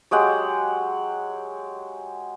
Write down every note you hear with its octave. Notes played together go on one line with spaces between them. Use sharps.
F#3 G#3 G4 F#5